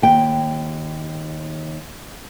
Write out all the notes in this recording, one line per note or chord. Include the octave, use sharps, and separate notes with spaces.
D#2 G5